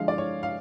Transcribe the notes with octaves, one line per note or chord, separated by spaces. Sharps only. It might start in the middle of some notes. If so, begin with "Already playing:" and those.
Already playing: D3 F3 G#3 F5
D5
C#5
F5